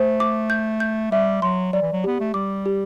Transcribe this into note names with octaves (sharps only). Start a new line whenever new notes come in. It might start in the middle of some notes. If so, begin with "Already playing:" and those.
Already playing: A3 C5
D6
G6
G6
G3 E5
F#3 C6
F#3 D5
E3
F#3
B3 G4
A3
G3 D6
G4